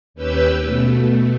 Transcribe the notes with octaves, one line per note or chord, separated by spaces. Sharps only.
D#2 C#4 G4 B4 G5 E6
B2 A3